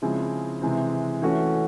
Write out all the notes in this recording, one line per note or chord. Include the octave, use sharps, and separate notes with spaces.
C#3 F3 G#3 C4 E4
C3 E3 G#3 C4
E3 A3 C#4 F#4